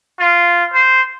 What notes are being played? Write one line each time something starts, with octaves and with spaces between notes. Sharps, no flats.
F4
C5